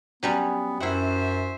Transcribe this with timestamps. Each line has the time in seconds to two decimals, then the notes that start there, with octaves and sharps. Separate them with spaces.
0.23 F#3 G3 B3 C#4
0.80 F#2 E4 F#4 C5 E5 F#5